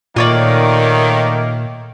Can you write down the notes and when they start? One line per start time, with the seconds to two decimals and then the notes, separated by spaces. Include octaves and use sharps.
0.16 A#2 D#3 A3 A#3 F4 C#5 D5 D6